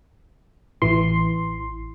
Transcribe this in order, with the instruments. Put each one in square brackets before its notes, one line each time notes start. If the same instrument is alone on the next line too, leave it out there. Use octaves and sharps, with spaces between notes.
[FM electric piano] A1 E3 C6